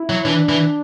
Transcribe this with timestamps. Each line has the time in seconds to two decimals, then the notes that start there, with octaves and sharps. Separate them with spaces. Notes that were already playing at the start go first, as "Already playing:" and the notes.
Already playing: E4
0.10 F#3
0.25 E3 D4
0.49 E3